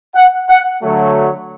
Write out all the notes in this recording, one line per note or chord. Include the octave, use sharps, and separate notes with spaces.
F#5
F#5
D3 F#3 A3